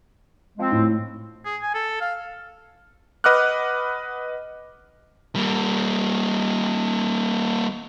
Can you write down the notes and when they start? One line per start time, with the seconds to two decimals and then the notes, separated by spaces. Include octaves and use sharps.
0.58 F3 G#3 C4
0.72 A2
1.45 G#4
1.62 G#5
1.74 A4
2.01 F5
3.24 B4 D#5 F#5 D6 F6 F#6
5.36 G3 A#3